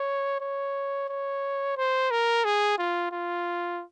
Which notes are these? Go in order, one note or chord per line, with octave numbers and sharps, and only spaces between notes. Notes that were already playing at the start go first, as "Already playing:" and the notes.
Already playing: C#5
C#5
C#5
C5
A#4
G#4
F4
F4